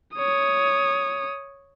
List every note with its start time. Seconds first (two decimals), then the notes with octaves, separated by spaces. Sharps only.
0.16 C#5 D#6